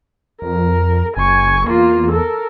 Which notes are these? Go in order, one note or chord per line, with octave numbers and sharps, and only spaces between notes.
F2 A#4
F#1 G#5 C#6
E2 A#3 F4
A4 A#4